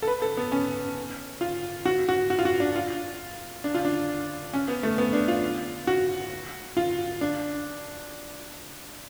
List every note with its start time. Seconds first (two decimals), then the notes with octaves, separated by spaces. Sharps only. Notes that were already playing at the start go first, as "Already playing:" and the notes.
0.02 A4
0.07 B4
0.22 A4
0.37 B3
0.52 C#4
1.41 F4
1.86 F#4
2.09 F#4
2.30 F#4
2.39 F4
2.45 F#4
2.60 D4
2.76 F4
3.64 D4
3.74 F4
3.85 D4
4.53 C#4
4.68 B3
4.83 A3
4.98 B3
5.13 D4
5.28 F4
5.87 F#4
6.77 F4
7.21 D4